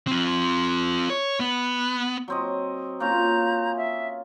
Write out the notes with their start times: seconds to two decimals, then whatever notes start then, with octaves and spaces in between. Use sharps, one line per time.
0.07 C4 F4
1.10 C#5
1.40 B3
2.28 F#3 C4 D#5
3.00 A#3 C#4 F4 A#5 G6
3.77 E5